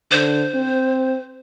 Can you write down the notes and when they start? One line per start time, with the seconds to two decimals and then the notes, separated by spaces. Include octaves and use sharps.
0.11 D3 C5
0.54 C4